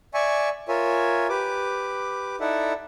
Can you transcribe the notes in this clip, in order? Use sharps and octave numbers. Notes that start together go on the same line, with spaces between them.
D5 E5 G#5 C#6
F4 A#4 C#5 E5 G#5
G4 B4 D6
D#4 E4 A4 D5 E5 F#5